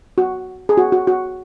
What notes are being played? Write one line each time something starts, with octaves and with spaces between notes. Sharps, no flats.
F#4
G#4
F#4
F#4
F#4